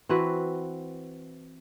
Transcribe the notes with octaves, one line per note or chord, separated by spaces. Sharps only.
E3 C4 F#4 B4